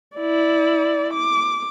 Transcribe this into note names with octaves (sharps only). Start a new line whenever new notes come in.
E4 D5
D6